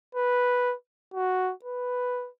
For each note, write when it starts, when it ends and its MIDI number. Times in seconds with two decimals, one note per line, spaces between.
0.15 0.75 71
1.14 1.52 66
1.65 2.29 71